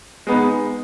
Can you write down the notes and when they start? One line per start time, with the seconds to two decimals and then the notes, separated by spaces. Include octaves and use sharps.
0.27 G#3 B3 D#4